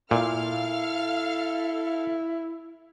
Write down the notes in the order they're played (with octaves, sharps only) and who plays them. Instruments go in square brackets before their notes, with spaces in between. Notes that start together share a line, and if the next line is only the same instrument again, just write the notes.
[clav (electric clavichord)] A#2 [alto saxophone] E4 [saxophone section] A4 [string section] F5 F6